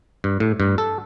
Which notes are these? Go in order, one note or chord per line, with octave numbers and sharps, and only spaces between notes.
G2
A2
G2
A4